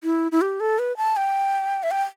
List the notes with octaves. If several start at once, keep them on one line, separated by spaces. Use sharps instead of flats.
E4
E4
G4
A4
B4
A5
G5
E5
G5